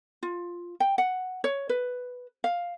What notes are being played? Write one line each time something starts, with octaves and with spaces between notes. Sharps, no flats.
F4
G5
F#5
C#5
B4
F5